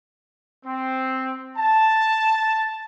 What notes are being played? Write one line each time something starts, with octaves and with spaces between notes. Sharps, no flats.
C4
A5